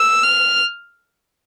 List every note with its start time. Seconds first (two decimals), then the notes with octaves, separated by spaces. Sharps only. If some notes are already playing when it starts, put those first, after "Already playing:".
Already playing: E6
0.23 F6